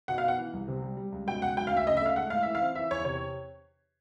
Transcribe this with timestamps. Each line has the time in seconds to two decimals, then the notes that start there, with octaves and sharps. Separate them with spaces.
0.08 B2 F#5
0.18 F5
0.23 B3 F#5
0.38 E3
0.53 C2
0.68 C3
0.82 G3
0.97 G3
1.12 C#2
1.27 B2 G5
1.41 C#2 F#5
1.57 F#3 G5
1.67 F5
1.71 D2
1.76 E5
1.86 C#3 D#5
1.97 E5
2.01 A3 F5
2.16 G#3 F#5
2.30 A2 F5
2.43 E3 E5
2.55 F5
2.61 C4
2.75 E3 E5
2.91 E2 C#5
3.05 C3 C#5